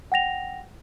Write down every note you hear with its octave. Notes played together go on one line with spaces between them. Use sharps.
F#5 G5 A#6 F7